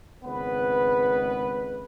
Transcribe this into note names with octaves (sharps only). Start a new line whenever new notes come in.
G#1 C#2 B3 B4